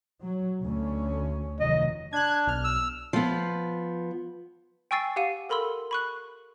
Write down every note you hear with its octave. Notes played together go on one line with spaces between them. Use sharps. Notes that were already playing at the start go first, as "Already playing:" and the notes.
F#3
D2 C#4
F1 D#3 F#3 D#5
D4 F#6 G#6
B1 F6
E6
F3 B3
G5 G#5 C#6 E6 A6 C7
G4 F5 F#5 D#7
A4 A#4 B5 C6 E6
B5 C#6 F#6